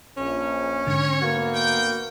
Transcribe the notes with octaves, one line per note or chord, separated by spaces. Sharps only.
A#1 C#4
G#2 D3 C#5
D2 A#3 B3 F#4
G5